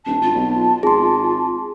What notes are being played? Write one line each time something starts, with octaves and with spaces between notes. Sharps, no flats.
D#1 D4 A5
G#1 F4
B1
G#1 G#4 C6